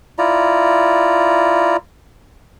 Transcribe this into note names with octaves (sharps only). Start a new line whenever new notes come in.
E4 F4 D5 A#5